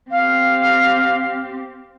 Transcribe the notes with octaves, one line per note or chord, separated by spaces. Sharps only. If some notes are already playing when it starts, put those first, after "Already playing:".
C4 G4 F5